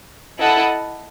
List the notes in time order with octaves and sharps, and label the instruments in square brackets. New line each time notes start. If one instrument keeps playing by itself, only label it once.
[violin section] E4 A4 D#5 F#5